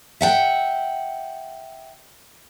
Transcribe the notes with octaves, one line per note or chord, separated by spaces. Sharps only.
E5 F#5 G5